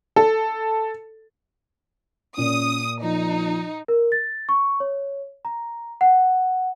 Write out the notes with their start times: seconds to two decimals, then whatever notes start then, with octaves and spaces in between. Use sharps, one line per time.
0.16 A4
2.38 A#2 C#4 D#6
3.03 F3 D#4
3.88 A#4
4.12 A6
4.49 C#6
4.80 C#5
5.45 A#5
6.01 F#5